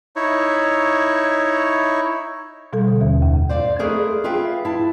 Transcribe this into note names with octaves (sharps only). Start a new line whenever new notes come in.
D#4 E4 C#5
B2 G3 A4
D3
D#2
F2
C5 D5 F5
G#3 A3 G#4 A#4 B4
F4 G#4 B4 E5 F5 G5
E4 A5